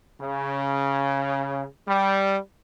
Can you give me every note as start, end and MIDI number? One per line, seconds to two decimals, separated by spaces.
0.21 1.65 49
1.87 2.38 55